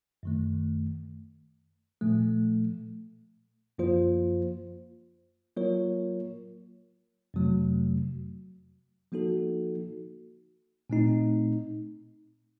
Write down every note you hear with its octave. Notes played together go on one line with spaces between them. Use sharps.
F#2 D#3 A3
A#2 F3 A3
F#2 F3 A#3 F4 C5
F#3 A#3 F4 A#4 C#5
F2 C3 F#3 A3
F3 A#3 D#4 F#4 A4
A#2 A3 C4 D#4